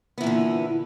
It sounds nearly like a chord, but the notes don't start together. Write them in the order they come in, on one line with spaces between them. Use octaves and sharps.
B3 E3 A#2 D3